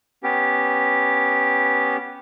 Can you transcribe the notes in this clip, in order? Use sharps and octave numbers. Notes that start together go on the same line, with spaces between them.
B3 C#4 G4